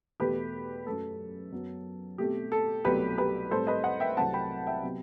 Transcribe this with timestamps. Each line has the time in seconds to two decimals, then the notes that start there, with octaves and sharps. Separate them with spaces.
0.20 E2 B2 A3 G4 B4
0.87 F#2 F#3 A3 A4
1.52 F#2 F#3 B3
2.18 B2 A3 C4 G4
2.52 A4
2.85 C2 B2 F#3 A3 C4 G4 B4
3.18 G4 B4
3.51 A2 G3 C4 A4 C5
3.67 B4 D#5
3.84 D#5 F#5
4.00 E5 G5
4.17 C2 C3 F#3 A3 C4 F#5 A5
4.34 G5 B5
4.67 E5 G5
4.83 C3 F#3 B3